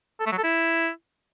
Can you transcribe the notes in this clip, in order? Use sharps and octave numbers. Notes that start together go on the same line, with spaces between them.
A4
A3
F#3
A4
E4